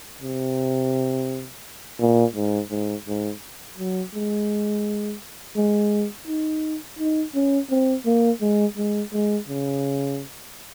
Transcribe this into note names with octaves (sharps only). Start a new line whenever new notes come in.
C3
A#2
G#2
G#2
G#2
F#3
G#3
G#3
D#4
D#4
C#4
C4
A#3
G#3
G#3
G#3
C#3